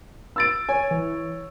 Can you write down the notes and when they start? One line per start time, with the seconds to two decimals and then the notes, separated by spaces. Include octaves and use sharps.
0.36 E6 A6 D7
0.69 C#5 G#5
0.91 E3